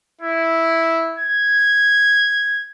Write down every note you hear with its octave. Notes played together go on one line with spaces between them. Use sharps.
E4
G#6